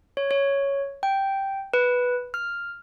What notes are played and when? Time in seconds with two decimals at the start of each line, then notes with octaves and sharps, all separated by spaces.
0.17 C#5
0.31 C#5
1.03 G5
1.74 B4
2.34 F6